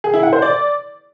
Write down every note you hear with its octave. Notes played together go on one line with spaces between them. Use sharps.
G#4
E4
F#5
C5
D5